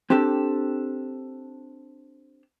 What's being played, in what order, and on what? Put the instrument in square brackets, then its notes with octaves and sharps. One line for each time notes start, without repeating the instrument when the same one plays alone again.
[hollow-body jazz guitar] C4 D4 G4 A4